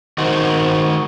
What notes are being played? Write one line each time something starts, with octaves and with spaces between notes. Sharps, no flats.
D#3 F#4 C5